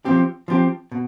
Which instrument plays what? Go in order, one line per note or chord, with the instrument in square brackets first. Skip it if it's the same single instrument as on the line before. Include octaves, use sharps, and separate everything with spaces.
[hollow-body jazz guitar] F3 C4 G4
F3 C4 G4
B2